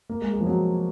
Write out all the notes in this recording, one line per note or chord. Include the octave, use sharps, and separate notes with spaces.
A#3
G#3
G#3
F3
F#3